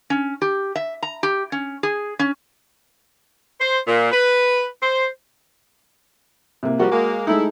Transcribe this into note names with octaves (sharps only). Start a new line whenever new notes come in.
C#4
G4
E5
A#5
G4
C#4
G#4
C#4
C5
A#2
B4
C5
C3 A#3
F3 G3 F#4 A#4
G#3 A#3
G#3 A3 D#4 E4